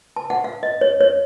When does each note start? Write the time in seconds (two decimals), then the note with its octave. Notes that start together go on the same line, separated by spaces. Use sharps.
0.16 A5
0.30 F#5
0.44 F5
0.63 D#5
0.81 C#5
1.01 C#5